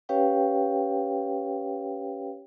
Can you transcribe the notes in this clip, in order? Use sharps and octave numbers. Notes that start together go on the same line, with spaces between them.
C#4 G4 B4 C#5 F5 G5